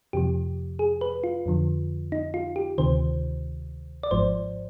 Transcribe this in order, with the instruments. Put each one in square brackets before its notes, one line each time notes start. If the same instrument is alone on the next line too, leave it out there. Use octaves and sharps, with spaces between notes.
[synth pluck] F2 C3 F3 G4
G#4
B4
F4
F2 D3 F3
D#4
F4
G4
D2 C3 D#3 C5
D5
G#1 G#2 F3 C5